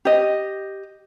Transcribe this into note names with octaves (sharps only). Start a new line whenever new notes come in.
G4 D#5